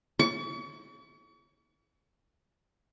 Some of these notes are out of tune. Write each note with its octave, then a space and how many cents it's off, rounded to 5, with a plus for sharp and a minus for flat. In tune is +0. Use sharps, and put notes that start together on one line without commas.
C#6 +40